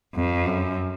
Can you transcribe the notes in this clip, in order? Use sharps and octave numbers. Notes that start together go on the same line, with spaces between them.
F2
F#2